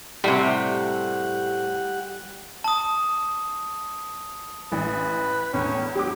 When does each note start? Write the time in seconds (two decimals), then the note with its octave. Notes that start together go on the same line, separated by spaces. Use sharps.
0.24 A2 C3 G3 G4 F#5
2.64 A5 D#6
4.72 A1 E3 B4
5.53 E2 A2 C#4
5.95 F#3 G4 D6